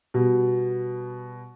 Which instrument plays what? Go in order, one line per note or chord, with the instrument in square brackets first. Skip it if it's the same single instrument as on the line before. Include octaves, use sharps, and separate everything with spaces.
[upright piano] B2 G3